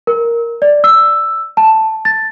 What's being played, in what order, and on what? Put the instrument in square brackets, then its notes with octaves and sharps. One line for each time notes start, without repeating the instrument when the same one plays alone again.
[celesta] A#4
D5
E6
A5
A6